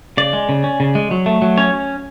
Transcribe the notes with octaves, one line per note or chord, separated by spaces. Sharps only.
C#3 D5
G#3
C#3
C#4
C#3
G#3
F#3
A3
F#3
C#4 C#5